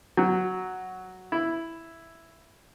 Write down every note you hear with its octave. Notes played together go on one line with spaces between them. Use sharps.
F#3
E4